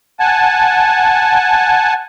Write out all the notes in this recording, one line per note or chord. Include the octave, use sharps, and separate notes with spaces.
F#5 G#5 A5